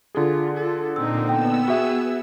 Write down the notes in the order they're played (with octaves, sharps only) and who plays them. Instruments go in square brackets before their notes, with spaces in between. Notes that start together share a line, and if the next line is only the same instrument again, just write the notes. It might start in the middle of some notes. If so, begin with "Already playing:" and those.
[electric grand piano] D3 G#4 [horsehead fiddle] F4
[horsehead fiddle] F4 A4
[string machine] A#2 A#3 [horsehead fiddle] C4 D#4 [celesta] E6
[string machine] B3 E6 [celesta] G5
[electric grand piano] F#4 E5 [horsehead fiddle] G#4